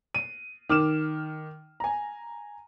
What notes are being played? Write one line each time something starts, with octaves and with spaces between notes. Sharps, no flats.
D#7
D#3 D6 F6 E7
G#5 A#5